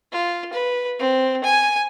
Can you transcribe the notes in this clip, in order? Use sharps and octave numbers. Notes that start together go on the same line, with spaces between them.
F4
B4
C4
G#5